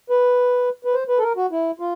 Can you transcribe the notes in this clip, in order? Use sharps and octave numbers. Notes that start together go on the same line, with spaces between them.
B4
B4
C5
B4
A4
A#4
F#4
E4
F4